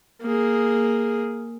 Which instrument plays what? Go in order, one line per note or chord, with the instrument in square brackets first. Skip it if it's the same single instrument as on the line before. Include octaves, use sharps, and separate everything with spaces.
[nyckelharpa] A#3 G#4